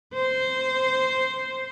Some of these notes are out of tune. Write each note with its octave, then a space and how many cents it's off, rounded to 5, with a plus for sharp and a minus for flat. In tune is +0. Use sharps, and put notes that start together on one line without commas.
C5 -10